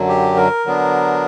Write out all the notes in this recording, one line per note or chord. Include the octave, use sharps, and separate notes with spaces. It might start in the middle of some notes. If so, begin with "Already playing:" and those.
Already playing: F#2 D3 F#3
G4
A#4
D3 F#3 B3 D4